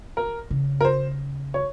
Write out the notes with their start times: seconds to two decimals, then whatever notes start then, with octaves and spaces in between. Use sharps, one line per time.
0.17 A#4
0.50 C#3
0.81 A#4
0.85 C5
1.54 C#5